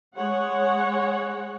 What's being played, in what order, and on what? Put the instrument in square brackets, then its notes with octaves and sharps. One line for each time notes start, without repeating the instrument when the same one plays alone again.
[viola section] G#3 C#5 F#5